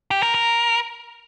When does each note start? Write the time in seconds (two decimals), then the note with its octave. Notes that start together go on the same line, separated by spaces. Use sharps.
0.11 G4
0.23 A#4
0.34 A#4